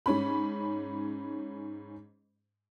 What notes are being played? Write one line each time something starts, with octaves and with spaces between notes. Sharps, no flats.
G#2 C#4 B5